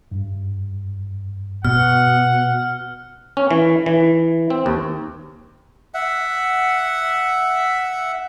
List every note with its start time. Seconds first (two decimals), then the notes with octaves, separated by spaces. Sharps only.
0.11 G2
1.65 B2 F#5 F6
3.37 C#4
3.51 E3
3.86 E3
4.50 C4
4.66 D#2
5.94 E5 F#5